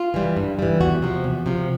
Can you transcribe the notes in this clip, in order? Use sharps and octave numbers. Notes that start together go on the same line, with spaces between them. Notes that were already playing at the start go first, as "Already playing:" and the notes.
Already playing: F4
E3 G3
G2
E3 G3
E2 F#4
C3 F3
E2
C3 F3